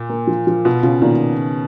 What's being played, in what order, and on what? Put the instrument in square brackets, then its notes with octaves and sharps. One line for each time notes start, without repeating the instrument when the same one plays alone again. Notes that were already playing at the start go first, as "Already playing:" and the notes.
Already playing: [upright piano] A#2
[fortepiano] A#3
F3
F3
[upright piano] B2 [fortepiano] F4
[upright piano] C#3 [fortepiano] F4
[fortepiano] A#2 [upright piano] D#3